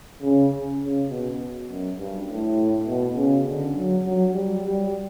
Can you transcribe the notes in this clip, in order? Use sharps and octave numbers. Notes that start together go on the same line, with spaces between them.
C#3
C#3
B2
F#2
G2
A2
B2
C#3
D3
F#3
F#3
G3
G3